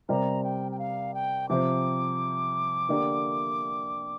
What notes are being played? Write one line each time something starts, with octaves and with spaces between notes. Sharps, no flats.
C3 G3 C4 A#4 D5 A#5
G5
G5
F5
G5
C3 F3 C4 D6
D3 A#3 G4 D5